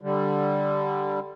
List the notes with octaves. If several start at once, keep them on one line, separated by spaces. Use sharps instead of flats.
D3 G3